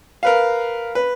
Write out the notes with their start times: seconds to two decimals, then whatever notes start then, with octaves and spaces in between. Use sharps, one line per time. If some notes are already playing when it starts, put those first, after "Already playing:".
0.23 A#4 B4 F5
0.95 B4